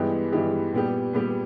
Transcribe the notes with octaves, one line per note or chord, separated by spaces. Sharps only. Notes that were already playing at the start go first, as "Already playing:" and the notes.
Already playing: G2 E3 G#3 B3 G4
G2 E3 G#3 B3 G4
A#2 G3 B3 G4
A#2 G3 B3 G4